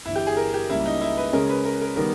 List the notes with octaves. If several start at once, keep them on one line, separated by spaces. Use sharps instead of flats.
G1 G2 E3 E4
G4
G#4
A#4
G4
C#2 C#3 G3 A#3 C#4 E4
D#4
E4
B4
C#3 G#3 C#4 G#4 A#4
B4
A#4
A#4
D#3 G3 B3 A#4